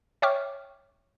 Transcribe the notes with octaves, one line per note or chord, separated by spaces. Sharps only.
C#5 E5 G5 C#6 D6 F6